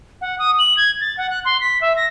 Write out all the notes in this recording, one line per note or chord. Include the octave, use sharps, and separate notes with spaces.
F#5
D#6
F#7
G#6
A6
F#5
F#6
C6
B6
E5
A#6